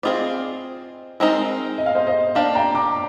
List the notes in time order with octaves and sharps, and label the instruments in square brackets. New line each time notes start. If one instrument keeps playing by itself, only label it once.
[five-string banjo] C4 F4 G#4 D5 [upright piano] C5 D#5
[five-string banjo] G#3 C4 D#4 A#4
[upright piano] D#5
F5
C5 D#5
C5 D#5
[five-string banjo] A#3 D4 G4 [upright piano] D5 F5
[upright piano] G5 A#5
A#5 D6